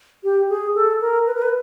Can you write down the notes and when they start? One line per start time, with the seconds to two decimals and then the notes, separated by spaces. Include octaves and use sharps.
0.24 G4
0.49 G#4
0.75 A4
1.01 A#4
1.26 B4
1.35 A#4
1.42 B4